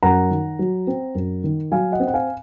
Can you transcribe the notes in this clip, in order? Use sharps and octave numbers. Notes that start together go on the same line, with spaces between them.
F#2 F#5 A#5
D#3
F#3
C4
F#2
D#3
F#3 F5 G#5
D#5 F#5
C4
F#5
F5 G#5